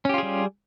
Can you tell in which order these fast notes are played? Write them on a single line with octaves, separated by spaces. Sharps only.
C#4 G4 F4 G#4 G3